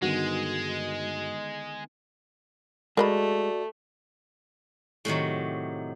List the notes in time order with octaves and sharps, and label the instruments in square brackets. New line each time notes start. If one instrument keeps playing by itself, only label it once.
[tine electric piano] G2 [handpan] D3 D#3 B3 [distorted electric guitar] G#3 [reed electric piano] F#4
[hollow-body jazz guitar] G#3 [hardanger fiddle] A3 [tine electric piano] F#4 D5 [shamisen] A#4 D#5 B5
[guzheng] A2 C3 D#3 F#3